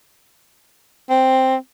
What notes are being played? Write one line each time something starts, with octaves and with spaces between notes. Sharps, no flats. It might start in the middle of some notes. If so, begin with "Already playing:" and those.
C4